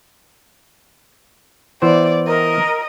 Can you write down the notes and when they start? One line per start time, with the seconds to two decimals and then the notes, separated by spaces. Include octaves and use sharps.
1.82 E3 B3 C5 D5
2.27 A#4 D#5